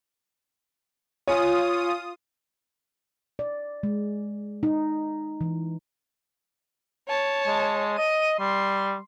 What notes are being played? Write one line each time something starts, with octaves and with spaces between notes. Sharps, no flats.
F4 C#5 G#5 D#6
D5
G#3
D#4
E3
C#5 A5
G#3
D#5 D#7
G3 C6